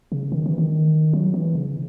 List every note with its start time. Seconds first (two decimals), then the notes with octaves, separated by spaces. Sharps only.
0.12 C#3
0.32 D#3
0.46 E3
0.58 D#3
1.13 F#3
1.34 E3
1.55 C#3